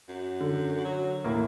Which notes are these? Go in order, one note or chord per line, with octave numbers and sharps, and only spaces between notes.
F#2
D3
F#3
A1 D#2 A2 A#3